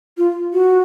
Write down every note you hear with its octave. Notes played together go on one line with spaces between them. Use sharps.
F4
F#4